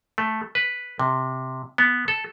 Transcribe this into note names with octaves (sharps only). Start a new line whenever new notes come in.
A3
B4
C3
B3
A4